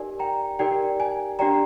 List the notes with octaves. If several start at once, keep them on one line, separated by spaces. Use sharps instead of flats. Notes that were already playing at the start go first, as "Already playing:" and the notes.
Already playing: D#4 G4 A#4 D5 G#5
G5 A#5
D#4 G4 A#4 D5 G5
G#5
D4 G4 D5 G5 A#5